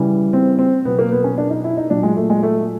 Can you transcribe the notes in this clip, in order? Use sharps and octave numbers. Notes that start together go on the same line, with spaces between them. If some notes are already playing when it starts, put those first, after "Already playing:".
Already playing: C#3 E3 G3
C4
C4
B2 F#3 B3
A#3
B3
C#4
D4
D#4
E4
D#4
A#2 F#3 D4
G#3
A3
G#3
A3